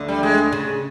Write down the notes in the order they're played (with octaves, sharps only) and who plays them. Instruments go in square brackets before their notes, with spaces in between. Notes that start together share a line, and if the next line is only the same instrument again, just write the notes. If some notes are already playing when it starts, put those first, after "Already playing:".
Already playing: [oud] D2 D3
[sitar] G3
G#3
[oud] C#3